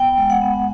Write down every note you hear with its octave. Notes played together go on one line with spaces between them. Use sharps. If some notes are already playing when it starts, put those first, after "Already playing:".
Already playing: B3 G5
G#3
F#5
B3